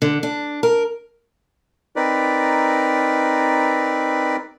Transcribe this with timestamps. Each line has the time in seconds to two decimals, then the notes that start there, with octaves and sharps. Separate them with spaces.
0.02 D3
0.23 D4
0.63 A#4
1.96 C4 D#4 A#4 B4 D5